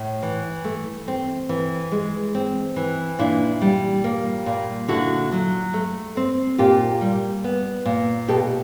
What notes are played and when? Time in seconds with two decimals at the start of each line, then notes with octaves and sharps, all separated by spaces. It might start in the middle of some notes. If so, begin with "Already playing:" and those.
Already playing: A2
0.23 E3
0.64 A3
1.08 C4
1.49 E3
1.92 G#3
2.35 C4
2.76 E3
3.19 A#2 D4 E4
3.61 G3
4.04 A#3
4.46 A#2
4.88 D3 E4 F#4
5.32 F#3
5.74 A3
6.17 C4
6.58 A#2 F4 G4
7.01 G3
7.44 B3
7.86 A#2
8.28 B2 G4 A4